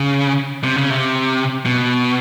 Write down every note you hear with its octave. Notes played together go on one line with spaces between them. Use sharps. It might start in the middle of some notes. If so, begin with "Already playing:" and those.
Already playing: C#3
C3
C#3
C3
B2